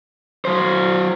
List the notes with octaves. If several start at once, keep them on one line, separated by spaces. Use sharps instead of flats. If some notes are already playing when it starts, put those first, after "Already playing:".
F#3 C5